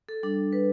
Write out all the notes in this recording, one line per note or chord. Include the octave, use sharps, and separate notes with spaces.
A4
G3 D4 A4
B4